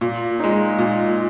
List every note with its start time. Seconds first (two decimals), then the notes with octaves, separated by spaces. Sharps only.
0.01 A#2
0.40 G#3 D#4
0.78 A#2